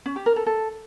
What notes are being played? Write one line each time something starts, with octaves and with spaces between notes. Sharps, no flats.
C#4
G4
A#4
A4
A4